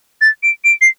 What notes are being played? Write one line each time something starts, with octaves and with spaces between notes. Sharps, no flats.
A6
D7
D7
C7